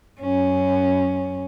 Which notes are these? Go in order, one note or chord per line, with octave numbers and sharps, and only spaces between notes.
F#2 C#4